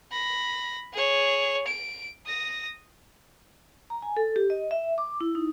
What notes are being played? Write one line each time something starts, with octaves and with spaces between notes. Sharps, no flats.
B5 A#6
G#4 C#5
D7
D#6 A#6
A#5
G#5
A4
G4
D#5
E5
D6
E4
D#4